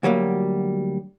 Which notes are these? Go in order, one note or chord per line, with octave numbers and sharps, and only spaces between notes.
D2 F#3 G3 A#3